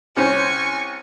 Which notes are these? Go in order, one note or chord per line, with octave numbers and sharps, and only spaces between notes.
C2 C#4 C5 G#5 C#6